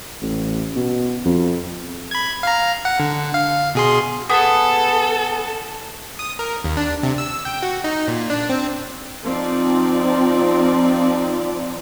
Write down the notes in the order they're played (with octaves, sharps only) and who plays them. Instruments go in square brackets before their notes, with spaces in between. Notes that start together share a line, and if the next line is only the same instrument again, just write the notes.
[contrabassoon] A1
B2
F2
[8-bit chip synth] B5 G#6
F5 A#5
F#5
D3
F5
B2 G#4 C6
[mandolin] B3 G#4 [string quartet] A4
[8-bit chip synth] D#6
A#4
D#2
D4
C3
E6
G5
F#4
D#4
A#2
D4
C4
[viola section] F3 C4 D#4 D5